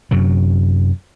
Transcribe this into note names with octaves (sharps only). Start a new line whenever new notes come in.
F#2 C3 F#3